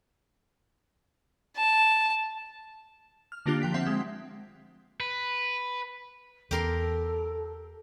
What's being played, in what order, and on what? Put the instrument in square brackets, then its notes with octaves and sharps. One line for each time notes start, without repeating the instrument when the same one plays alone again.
[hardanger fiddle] A5
[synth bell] F6
D3 A#3 D4 F4 G4 F#6
F3 G5 B6
C4 E5 F#5 C6
G#3
[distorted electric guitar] B4
[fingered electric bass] E2 [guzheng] G4 A#4 C6 [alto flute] A4